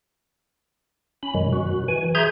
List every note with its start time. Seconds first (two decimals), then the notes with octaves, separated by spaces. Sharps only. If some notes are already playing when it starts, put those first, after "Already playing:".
1.23 C#4 B5
1.35 F#2 B2 D#3 F#3 G#3
1.53 F#4
1.88 E3 G#5
2.15 G#4 E5 A#5 C6 G6 G#6